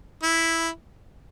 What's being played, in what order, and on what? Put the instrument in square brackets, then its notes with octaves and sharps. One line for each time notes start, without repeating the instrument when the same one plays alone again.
[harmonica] E4